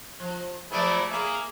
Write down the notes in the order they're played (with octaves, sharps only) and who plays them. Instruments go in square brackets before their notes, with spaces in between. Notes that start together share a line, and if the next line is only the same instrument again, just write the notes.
[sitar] F3
[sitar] F3 F#3 B3 [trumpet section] A3 G#4 D5 [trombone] E4
[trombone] A#3 [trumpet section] G#4 [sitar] E5